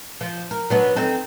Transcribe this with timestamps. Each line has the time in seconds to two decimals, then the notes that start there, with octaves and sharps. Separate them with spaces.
0.21 F3
0.51 A#4
0.70 F#3 B3 D4
0.96 C4 D#4 A4